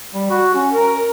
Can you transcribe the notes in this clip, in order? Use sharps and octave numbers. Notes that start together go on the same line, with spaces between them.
G3
F#4
C#4
A#4